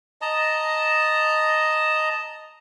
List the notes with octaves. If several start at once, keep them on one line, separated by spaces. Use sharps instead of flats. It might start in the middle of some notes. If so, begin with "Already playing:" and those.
D#5 A5 A#5